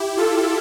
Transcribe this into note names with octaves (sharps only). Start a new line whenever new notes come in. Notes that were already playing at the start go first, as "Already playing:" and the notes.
Already playing: E4 G4
F4 A4